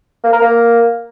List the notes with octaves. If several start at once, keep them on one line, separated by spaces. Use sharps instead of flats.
A#3
A#4
A#3